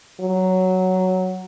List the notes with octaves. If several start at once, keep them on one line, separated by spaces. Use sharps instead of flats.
F#3